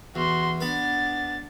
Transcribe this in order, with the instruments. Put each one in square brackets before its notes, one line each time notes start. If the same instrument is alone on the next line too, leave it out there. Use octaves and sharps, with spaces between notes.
[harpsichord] E2 [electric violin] F#4 C6
[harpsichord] B3 B4 [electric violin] D4 A6